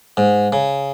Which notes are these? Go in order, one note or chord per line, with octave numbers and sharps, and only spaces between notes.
G#2
C#3